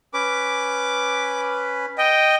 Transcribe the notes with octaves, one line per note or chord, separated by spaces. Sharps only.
C#4 B4 D6
D#5 G5